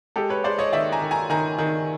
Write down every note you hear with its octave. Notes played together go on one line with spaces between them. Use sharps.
G#3 G4 A4
B4 C#5
G#3 C5 D5
C#5 D#5
D#3 D5 E5
G#5 A#5
D#3
G#5 A#5
D#3 G#5 A#5
D#3